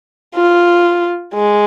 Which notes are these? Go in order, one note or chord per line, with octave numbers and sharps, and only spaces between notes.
F4
G#3